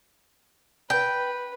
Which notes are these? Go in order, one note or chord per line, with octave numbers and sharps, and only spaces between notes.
B4 G5